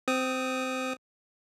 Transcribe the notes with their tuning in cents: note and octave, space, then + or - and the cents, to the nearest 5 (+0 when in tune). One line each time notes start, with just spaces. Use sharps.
C4 -15 D#6 +0